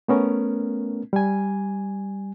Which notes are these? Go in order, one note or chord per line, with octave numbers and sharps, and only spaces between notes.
A3 B3 C#4 A#4
G3 G#5